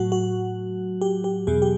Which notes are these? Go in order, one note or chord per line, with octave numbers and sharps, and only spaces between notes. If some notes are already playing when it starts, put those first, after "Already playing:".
Already playing: A2 F#3 F#4
F#4
G4
G4
E2 B2 F#3 G#4
G4